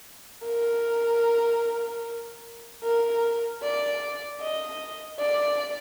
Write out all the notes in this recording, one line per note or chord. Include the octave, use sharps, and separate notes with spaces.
A#4
A#4
D5
D#5
D5